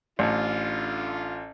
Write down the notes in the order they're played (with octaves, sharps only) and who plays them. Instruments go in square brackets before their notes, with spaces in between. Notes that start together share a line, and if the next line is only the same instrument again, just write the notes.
[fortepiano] A1 [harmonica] D3 F4